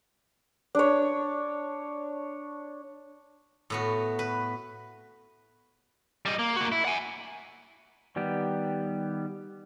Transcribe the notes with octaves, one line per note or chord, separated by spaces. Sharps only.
D4 C#5
A2 B3 F#4
B4
G3 D#5
A#3
A#3 F#4
E4
F#5 G#5
D#3 G3 B3 G4